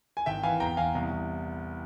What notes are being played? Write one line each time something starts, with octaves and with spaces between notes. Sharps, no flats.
G#5
G#1 E5 G5
E3 F5 G#5
E2 G5 A#5
E2 F5 G#5
C2
C2